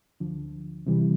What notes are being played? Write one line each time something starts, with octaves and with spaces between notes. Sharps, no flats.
D2 D3 F3
C3 E3 G3